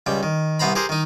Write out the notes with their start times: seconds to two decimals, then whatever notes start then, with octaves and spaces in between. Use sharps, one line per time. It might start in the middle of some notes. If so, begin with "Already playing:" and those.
0.06 C#2 G3 G5
0.23 D#3
0.59 C2 B3 C5 A#5 B5
0.75 G4 G#4 A#4 C5
0.89 D#3 D#4